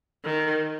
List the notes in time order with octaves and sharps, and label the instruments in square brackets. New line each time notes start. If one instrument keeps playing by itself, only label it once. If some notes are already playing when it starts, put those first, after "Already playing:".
[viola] D#3